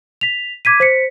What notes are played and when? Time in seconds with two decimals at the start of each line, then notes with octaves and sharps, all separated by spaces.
0.21 B6 F7
0.65 D6 G#6 B6 D#7
0.80 C5 B6 C#7